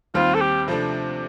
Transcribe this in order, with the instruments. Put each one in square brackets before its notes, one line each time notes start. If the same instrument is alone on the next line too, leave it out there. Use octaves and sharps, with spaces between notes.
[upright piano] D#2 D#3 G3 C4 [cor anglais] F4
[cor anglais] A4
G4
[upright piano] C3 F3 A3 D4